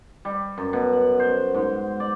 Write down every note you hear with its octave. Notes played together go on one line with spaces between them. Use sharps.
G3
F#2
B2
F#5
C5
G#2
D5